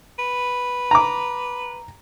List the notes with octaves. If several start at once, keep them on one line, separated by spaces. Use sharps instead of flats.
B4
A#5 D6